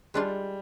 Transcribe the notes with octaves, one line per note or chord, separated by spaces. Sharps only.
G3 G#3 D4 F4